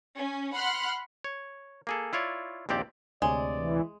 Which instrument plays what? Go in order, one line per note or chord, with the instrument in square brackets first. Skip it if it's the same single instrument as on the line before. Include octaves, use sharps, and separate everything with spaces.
[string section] C#4
F#5 B5 C6 F6 F#6
[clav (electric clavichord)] C#5
A#3 G#4 A4
E4 F4 C#5 D5
A#1 D#2 C4 G4 D5
[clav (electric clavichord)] D2 C3 C#5 [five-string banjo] G#3 [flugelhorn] D5
[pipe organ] E3